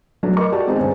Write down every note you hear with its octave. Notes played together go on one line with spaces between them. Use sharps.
F#3 A3 D4
A#4 D#5 C#6
F#4 G4 D5 A5
D#3 G#3 C4 D#4 C5
G2 D3 B3 C#4